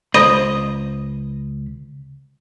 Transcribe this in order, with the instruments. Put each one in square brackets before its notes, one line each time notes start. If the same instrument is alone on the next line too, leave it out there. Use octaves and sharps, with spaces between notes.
[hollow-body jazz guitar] C#2 C5 B5 [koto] D#5